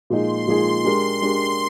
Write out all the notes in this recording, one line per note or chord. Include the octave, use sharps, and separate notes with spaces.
A#2 F3 G#3 D#4 G#4 C6
A#2 F3 G#3 D#4 G#4 C6
G#3 D4 G4 A#4 C6
G#3 D4 G4 A#4